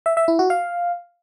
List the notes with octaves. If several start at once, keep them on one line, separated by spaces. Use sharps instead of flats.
E5
E5
E4
F#4
F5